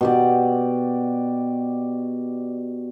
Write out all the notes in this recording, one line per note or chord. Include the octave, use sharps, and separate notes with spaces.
B2 G4 D5